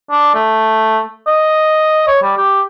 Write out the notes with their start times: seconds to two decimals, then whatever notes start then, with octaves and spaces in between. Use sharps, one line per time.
0.10 D4
0.34 A3
1.27 D#5
2.07 C#5
2.22 G3
2.37 G4